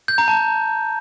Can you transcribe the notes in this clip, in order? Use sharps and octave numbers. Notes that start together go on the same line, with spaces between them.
G6
A#5
A5